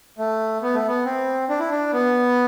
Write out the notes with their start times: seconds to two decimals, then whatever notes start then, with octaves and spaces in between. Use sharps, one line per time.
0.18 A3
0.62 B3
0.74 A3
0.88 B3
1.05 C4
1.49 D4
1.60 E4
1.70 D4
1.93 B3